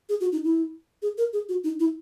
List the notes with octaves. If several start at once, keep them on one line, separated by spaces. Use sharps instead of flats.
G#4
F#4
D#4
E4
G#4
A#4
G#4
F#4
D#4
E4